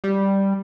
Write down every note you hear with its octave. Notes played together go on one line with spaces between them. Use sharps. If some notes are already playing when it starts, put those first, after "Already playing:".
G3